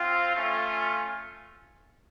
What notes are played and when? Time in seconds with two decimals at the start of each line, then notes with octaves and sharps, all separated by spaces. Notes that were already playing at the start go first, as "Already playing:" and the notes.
Already playing: C4 F4
0.35 A3 C#4 F4